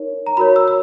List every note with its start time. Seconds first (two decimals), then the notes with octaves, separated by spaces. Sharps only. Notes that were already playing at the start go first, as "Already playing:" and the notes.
Already playing: D#4 A#4 C#5
0.26 A#5
0.37 F#4 A#4 C#5 B5
0.56 E6
0.68 E6